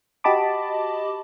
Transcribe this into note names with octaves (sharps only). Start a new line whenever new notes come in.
F#4 G4 D#5 A5 B5 D6